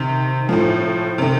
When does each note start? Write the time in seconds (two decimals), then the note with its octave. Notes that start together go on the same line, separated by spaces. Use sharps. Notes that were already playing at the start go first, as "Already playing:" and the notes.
Already playing: C3 D#3
0.49 A2 F3
1.18 C3 D#3